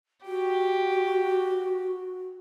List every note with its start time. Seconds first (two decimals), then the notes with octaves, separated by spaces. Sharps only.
0.25 F#4 G4